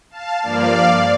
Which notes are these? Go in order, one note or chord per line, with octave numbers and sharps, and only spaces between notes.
F5 A5
G2 F3 A#3 D5 F5